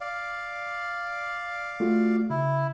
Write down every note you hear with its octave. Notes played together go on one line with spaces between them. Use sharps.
D5 F5
A3 F4 F#4
C#3 E4